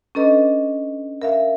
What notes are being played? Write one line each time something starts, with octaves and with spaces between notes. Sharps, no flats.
C#4 D4 A4 B4 D#5
A#4 E5 F5